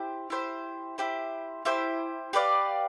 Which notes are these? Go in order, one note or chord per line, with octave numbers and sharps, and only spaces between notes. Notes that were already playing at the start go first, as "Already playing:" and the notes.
Already playing: E4 G4 C5
E4 G4 C5
E4 G4 C5
E4 G4 C5
G4 B4 D5 F5